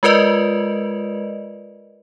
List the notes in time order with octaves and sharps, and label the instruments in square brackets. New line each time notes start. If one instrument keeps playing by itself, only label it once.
[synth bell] G#3 F4 A#4 B4 D5 D#5